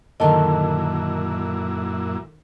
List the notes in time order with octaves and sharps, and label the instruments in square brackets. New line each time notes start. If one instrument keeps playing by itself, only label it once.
[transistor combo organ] F#2 A#2 E4 [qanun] D3 D#3 [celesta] D#5 A5